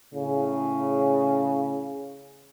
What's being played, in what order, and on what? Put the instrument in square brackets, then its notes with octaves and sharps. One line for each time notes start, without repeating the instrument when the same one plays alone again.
[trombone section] A2 C#3